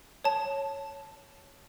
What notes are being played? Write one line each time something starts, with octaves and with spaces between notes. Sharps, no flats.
C#5 A5